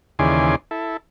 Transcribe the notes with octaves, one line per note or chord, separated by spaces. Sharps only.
D#2 C#3 E3 G#4 D5 C6
E4 A4